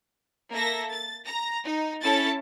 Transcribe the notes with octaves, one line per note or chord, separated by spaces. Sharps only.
A#3 A4 E5 A#6
A6
A#5 A#6
D#4
C#4 E4 A4 A5 A6